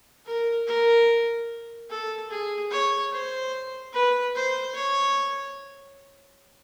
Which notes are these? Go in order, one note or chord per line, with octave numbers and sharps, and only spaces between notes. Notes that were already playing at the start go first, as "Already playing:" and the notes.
A#4
A#4
A4
G#4
C#5
C5
B4
C5
C#5